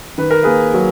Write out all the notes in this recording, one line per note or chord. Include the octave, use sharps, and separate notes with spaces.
D#3 B4
A#4
A#3 G#4 B4
F#3